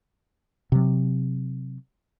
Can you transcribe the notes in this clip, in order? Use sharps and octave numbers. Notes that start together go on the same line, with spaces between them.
C3 F#3